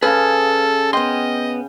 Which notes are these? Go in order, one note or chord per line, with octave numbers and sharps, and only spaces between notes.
C#3 A4 B4 F5
B3 D#5 G5 C6